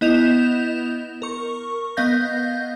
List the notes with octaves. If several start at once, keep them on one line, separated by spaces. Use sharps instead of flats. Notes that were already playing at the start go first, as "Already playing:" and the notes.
B3 E4 D#5 G6 E7 F7
A#4 C#6
B3 D#5 F5 G6 A#6